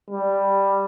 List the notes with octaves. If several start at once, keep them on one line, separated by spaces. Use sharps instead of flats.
G3